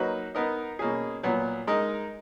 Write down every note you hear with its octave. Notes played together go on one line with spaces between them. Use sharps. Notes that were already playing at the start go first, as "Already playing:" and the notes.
Already playing: F#3 A#3 D#4 F#4 B4
B3 D#4 A#4 D#5
B2 A#3 C#4 G#4
A#2 F#3 B3
G#3 D#4 A#4 D#5